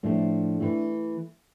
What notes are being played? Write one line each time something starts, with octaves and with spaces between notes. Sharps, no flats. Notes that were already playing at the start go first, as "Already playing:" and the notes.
A2 F3 A3 A#3 D4
E3 A3